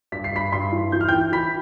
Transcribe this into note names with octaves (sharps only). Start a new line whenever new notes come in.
G2 B6
C7
G2 B5 B6
G2 C6 C7
E3
E3 G6
F6
G5 G6
E3
E3 B5 B6